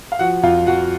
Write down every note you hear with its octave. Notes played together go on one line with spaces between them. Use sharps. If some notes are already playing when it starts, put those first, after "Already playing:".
F5
F3 F#4 F#5
F2 F4 F5
F2 F#4 F#5